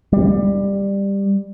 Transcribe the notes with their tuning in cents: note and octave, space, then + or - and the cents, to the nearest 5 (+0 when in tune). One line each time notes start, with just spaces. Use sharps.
G3 +15